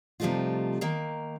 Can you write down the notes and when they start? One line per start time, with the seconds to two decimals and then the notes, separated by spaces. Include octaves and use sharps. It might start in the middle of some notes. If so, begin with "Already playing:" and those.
0.20 C3 F3 G3 A3 D#4 F4
0.81 D#3 A#3